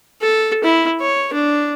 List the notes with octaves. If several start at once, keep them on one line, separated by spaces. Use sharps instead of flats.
A4
E4
C#5
D4